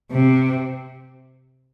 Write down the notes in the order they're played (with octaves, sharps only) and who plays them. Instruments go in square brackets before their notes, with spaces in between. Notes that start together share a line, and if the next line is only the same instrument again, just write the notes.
[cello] C3